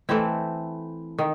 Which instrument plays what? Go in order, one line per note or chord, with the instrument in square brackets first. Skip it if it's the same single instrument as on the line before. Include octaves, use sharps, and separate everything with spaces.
[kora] E3 A3 C4 E4
D#3